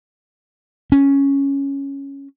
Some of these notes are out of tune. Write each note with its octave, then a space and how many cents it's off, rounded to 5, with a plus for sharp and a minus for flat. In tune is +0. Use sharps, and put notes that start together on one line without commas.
C#4 +0